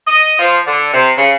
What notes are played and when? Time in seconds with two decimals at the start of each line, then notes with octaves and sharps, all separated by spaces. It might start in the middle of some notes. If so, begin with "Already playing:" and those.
0.07 D#5
0.39 F3
0.67 D3
0.94 C3
1.17 C#3